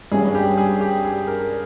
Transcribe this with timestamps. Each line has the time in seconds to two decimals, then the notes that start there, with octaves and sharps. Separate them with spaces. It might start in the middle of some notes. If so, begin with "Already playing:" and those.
0.12 G2 G3 C#4 G#4
0.35 G4
0.58 G#4
0.81 G4
1.05 G#4
1.27 A#4